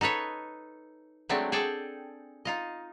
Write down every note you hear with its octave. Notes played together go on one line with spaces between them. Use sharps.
D#4 A4 B4 C#5
F#3 G#3 A3 C4 D4
G#4 A4 D5 G5
D#4 F4 D#5